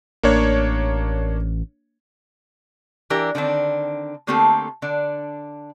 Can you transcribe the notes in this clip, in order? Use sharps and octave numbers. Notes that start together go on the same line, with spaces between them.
A1 A#3 D4 C#5
E3 D4 G4 A#4
D3 D#3 C4 D4
D3 A3 A#3 C4 G4 A4
D3 D4